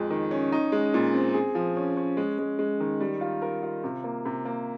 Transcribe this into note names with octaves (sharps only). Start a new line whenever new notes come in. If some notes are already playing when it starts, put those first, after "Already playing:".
Already playing: F2 G#3
D#3
C#4
D#4
G#3
A#2
C4
G#4
F3
C#4
C#4
G#3
G#3
G#3
D#3
G3
F4
A#4
F4
C3
A#3
C3
A#3